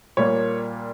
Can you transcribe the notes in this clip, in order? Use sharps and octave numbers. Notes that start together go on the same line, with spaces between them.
A#2 G3 A#3 C#5